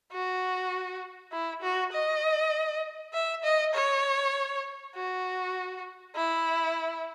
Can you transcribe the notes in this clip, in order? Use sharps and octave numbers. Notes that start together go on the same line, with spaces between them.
F#4
E4
F#4
D#5
E5
D#5
C#5
F#4
E4